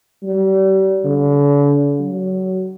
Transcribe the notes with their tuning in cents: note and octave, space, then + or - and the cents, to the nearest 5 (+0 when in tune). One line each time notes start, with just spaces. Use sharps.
G3 -35
D3 -45
F#3 +20